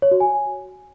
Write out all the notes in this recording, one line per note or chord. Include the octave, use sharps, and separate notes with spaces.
C#5
F#4
G#5